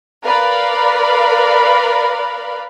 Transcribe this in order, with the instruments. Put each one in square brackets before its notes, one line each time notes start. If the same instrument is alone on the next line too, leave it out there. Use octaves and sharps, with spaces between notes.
[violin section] A#4 B4 D5 F5 B5